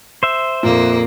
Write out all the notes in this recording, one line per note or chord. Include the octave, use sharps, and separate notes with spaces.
C5 E5
F2 A#2 A#3